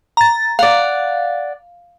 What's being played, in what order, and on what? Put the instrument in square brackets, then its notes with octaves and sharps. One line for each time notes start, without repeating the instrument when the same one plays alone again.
[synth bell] A#5 A6
[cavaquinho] D5 F#5 [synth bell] F5